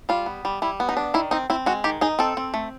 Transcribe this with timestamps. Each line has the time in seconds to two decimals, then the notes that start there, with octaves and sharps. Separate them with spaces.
0.09 G3 F4
0.26 B3
0.45 G3
0.62 G3 E4
0.80 B3
0.89 D#4
0.97 D4
1.14 D#3 E4
1.31 C4 D#4
1.50 C4 E4
1.66 G#3 F#4
1.84 D#3 G4
2.01 D#4 G#4
2.19 C4 A4
2.37 C4
2.54 A3